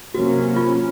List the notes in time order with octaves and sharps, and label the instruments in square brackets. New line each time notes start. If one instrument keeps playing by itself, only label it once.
[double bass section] C3 F#3 A#3 C#4 [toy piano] F#4
[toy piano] F4